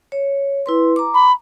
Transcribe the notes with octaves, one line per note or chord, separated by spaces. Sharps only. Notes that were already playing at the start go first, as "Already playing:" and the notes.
C#5
E4 B4 C6
A#5 D6
B5